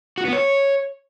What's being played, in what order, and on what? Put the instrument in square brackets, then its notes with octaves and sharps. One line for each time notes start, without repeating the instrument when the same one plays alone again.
[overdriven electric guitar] F#4
B3
C#5